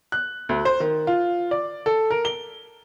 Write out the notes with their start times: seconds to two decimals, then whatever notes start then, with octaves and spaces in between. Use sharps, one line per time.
0.12 F#6
0.49 D2
0.65 C5
0.80 D#3
1.07 F4
1.51 D5
1.86 A4
2.10 A#4
2.25 G7